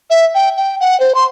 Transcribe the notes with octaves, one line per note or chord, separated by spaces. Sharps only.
E5
G5
G5
F#5
C5
C6